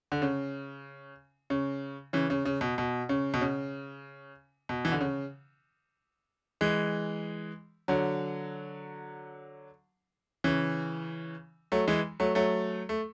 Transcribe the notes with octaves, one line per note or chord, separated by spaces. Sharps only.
D3
C#3
C#3
C#3 E3
C#3
C#3
B2
B2
C#3
B2
C#3
B2
E3
D3
C#3
E3 G#3
D3 F#3
C#3 E3
F#3 A3
E3 G#3
F#3 A3
F#3 A3
A3